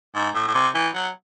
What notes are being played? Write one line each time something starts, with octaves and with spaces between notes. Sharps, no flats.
G#2
A2
A2
C3
E3
F#3